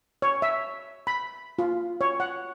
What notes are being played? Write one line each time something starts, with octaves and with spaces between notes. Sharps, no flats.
C#5
E5
B5
F4
C#5
F#5